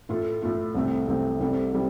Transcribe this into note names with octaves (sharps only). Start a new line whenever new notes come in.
A2 A3 F4 A4
A2 A3 F4 A4
C2 C3 A3 C4
C2 C3 A3 C4
C2 C3 G3 C4 A4
C3 G3